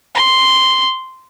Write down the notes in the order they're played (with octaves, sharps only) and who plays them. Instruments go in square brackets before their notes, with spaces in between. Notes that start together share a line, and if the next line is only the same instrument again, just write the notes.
[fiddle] C6